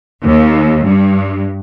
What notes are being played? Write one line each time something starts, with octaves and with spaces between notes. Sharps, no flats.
D#2
G2